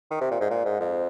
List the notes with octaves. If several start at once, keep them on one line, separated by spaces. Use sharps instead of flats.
D#3
C3
A#2
G#2
A#2
G#2
F2